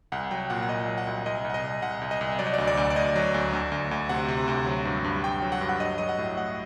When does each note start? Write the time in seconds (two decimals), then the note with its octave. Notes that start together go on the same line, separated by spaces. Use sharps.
0.12 C2 F#5
0.31 F#3 G5
0.50 A#2 F#5
0.62 F#5
0.69 A#2 D#5
0.88 F#3
0.98 F#5
1.07 C2
1.26 C2 D#5
1.45 C2 F#5
1.54 D#5
1.64 C2
1.82 C2 F#5
2.02 C2
2.11 D#5
2.21 C2
2.39 F#3 D5
2.47 D#5
2.54 D5
2.58 D2
2.67 D5
2.77 D2
2.90 D5
2.96 D2 D#5
3.16 F#3
3.34 D2
3.53 D2
3.72 D2
3.91 D2
4.09 C3 F#5
4.28 C3
4.48 D2
4.66 F#3
4.85 G2
5.04 G2
5.23 G2 G5
5.42 F#3
5.52 F#5
5.61 G2
5.69 F#5
5.80 F#3 D#5
5.98 F#3 D#5
6.09 F#5
6.18 A2
6.37 F#3 F#5